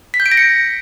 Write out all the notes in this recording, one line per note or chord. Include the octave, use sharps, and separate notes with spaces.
B6
G6
D7
A#6
C#7